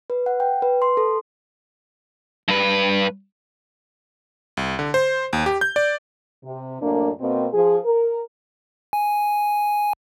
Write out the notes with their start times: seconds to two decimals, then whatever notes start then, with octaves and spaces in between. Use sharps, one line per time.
0.10 B4
0.26 F#5
0.40 G5
0.62 B4
0.82 C6
0.97 A4
2.48 G2 B4
4.57 C2
4.79 D3
4.94 C5
5.33 D#2
5.46 G4
5.61 G6
5.76 D5
6.45 C3
6.81 F#2 A2 A#3 D4
7.20 B2 A#3 C4
7.54 F3 G#4
7.85 A#4
8.93 G#5